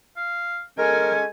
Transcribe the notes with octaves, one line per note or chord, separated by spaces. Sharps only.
F5
G#3 C#4 A4 A#4 G#5